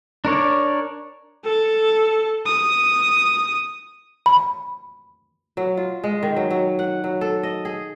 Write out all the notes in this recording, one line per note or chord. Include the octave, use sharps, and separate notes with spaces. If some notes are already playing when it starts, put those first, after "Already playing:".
D4 A#4 C#5 D5
A4
D#6
B5
F#3
F4
G#3
D#3
F#3
F#3
F#5
F#3
A4
D#5
G#4